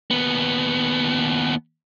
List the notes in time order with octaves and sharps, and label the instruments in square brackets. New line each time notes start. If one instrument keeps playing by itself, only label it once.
[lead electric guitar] D#2 B3